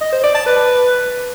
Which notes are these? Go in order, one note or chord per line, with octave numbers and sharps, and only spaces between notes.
D#5
C5
D5
A5
B4